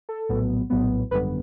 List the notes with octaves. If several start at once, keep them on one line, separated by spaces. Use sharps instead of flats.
A4
A#1 A2 F#3 B3
A#1 A2 F#3 B3
G#1 F#2 D3 G3 B3 B4